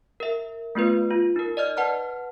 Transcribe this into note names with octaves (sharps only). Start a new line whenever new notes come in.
A#4 E5
A3 B3 F4 B4
F4
D#4 A#4
D5 D#5 F6
B4 F#5 A5 F6